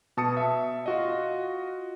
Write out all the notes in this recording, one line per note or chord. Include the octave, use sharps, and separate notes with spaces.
B2 A5 D#6 C#7
E5
F4 F#4 D#5